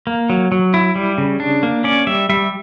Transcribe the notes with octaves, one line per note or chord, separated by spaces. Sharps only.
A#3
F#3
F#3
E4
G3
C#3
D4
A#3
C#4 D5
G3 E5
G3 E5